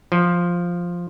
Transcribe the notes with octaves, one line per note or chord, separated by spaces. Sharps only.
F3